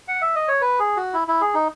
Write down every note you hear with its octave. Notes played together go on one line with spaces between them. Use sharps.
F#5
E5
D#5
C#5
B4
G#4
F#4
E4
E4
G#4
D#4